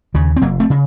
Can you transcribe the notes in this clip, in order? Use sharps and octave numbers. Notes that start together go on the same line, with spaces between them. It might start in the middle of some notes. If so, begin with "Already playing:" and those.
D#2 C#3
C4
F1 F#3 A#3
A3 C4
C#3